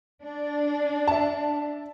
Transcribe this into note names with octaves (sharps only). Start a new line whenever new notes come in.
D4
E5 A5